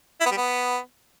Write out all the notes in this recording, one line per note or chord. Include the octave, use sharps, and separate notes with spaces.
E4
B3
G3
B3